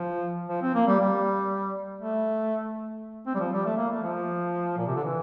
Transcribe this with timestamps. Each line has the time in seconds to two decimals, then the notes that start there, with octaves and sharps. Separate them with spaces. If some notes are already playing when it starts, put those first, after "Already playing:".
Already playing: F3
0.49 F3
0.62 C4
0.74 A#3
0.87 G3
1.00 G3
2.01 A3
3.27 C4
3.35 G3
3.40 F3
3.53 G3
3.65 A3
3.77 A#3
3.90 A3
4.02 F3
4.77 A#2
4.86 C3
4.95 D3
5.04 E3